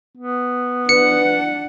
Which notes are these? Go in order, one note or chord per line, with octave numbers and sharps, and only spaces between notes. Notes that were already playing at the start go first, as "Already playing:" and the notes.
B3
D4 B4 F#5 C#7